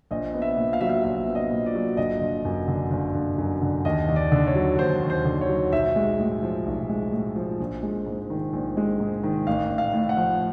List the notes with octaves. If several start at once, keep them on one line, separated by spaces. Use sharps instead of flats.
A#1 D#5
B3
E5
A#2
F5
F#3 E5
F5
A#1 E5
B3
D#5
A#2
D5
F#3
G1 D#5
G1
F#2
D3
G1
G1
F#2
D3
D#2 D#5
D#2
D5
D3
C#5
F#3
D#2 C5
D#2
C5
D3
C#5
F#3
B1 E5
G#3
A2
F3
B1
G#3
A2
F3
A#1
G#3
G#2
D#3
A#1
G#3
G#2
D#3
A1 F5
A1
F5
A2
F#5
F3